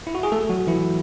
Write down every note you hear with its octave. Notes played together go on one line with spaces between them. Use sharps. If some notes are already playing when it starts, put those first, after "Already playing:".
E4
F#4
G#4
A3 A4
F#3 F#4
E3 E4